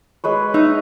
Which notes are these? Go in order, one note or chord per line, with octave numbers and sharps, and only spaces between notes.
G#3 B4 C#5
D#4 E5